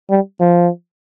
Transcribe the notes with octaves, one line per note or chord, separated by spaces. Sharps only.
G3
F3